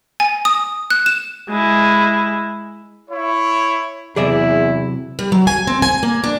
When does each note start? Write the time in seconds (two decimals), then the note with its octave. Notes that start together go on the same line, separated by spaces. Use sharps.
0.20 G#5
0.45 D#6
0.90 F#6
1.06 E7
1.49 G#3 E4
3.10 E4 C#5
4.16 E2 C3 F#3 E4 G#4 D5 E5
5.19 G3
5.32 F#3
5.47 G#5
5.67 C4
5.82 G#5
6.03 A#3
6.24 D4